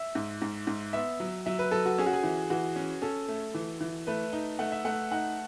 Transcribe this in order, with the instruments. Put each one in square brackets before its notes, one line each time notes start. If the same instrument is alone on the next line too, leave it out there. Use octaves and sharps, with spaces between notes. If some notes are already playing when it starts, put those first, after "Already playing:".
Already playing: [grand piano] E5
[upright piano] G#2
G#2
G#2
[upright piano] B3 [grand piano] E5
[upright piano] F#3
[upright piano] F#3 [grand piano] E5
[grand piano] B4
[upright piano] F#3 [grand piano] A4
[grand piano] F#4
[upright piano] C#4 [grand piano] G#4
[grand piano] F#4
G#4
[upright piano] E3
[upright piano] E3 [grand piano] F#4
[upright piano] C#4
[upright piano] C#4 [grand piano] A4
[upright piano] A3
E3
E3
[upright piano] A3 [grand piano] B4
[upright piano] D#4
[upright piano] A3 [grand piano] F#5
[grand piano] E5
[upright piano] A3 [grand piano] F#5
[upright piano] D#4 [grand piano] F#5